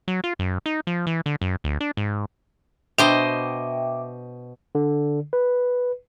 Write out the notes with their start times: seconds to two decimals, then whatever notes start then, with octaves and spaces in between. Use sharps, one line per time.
0.08 F#3
0.24 F4
0.39 F#2
0.66 D#4
0.87 F3
1.07 E3
1.26 D3
1.41 F#2
1.64 D2
1.80 D4
1.97 G#2
2.98 B2 D4 C5 D#5 E5 G5 D6
4.75 D3
5.33 B4